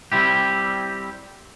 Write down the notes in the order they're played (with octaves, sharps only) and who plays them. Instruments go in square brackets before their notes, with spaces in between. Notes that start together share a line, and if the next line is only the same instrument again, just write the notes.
[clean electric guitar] G3 C4 E4 G4